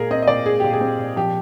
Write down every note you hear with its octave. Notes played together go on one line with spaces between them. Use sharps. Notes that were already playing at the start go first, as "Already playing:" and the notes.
Already playing: A#2 G#3 G#4 A#4
C4 D#5
D#5
A#2 D5
G#3 G#4
A#2 G4
G#4
C4
A#2
F3 G4